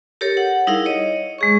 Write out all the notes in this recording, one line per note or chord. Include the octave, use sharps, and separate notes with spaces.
G4 A4 A#4 C#5
F#5
G3 D#4 E4 G#4 A#4 F5
C#5 D#5
G#3 G#4 C#6